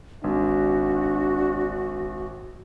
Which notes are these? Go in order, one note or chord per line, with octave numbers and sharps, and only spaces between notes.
G#1 D4 F#4